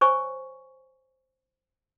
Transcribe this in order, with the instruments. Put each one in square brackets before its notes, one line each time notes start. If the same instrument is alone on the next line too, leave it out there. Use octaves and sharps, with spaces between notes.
[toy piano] C5 C#5 G#5 C#6